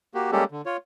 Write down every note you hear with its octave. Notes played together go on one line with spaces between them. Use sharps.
A#3 F#4 G4
G3 G#3 A#3 C#4 G4 A4
D3
F4 C#5